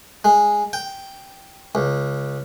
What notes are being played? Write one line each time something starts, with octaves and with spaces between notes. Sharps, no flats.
G#3
G5
C#2